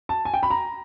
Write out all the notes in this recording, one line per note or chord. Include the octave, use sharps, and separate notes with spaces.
A5
G#5
G5
B5
A#5